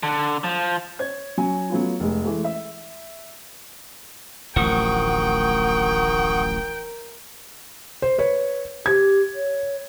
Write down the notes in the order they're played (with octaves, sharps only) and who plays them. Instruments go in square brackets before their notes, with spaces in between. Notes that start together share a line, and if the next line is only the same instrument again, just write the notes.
[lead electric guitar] D3
F3
[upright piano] C#5 G#6
F#3 C#4 G#5
F#3 A3 B3 C#4 F4
F1 G#3
E3 G#3 A3
E5
[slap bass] D1 A1 F3 [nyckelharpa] A#4 [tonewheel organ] F#5 C#6 D#6 [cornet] G5
[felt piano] C5
B4 C#5
[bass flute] G4 [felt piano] G#6
[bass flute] C#5